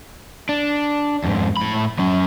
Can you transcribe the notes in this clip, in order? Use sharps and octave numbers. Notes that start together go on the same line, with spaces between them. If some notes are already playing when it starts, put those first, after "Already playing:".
D4
F2 G#2
A2 B5
F#3 C#4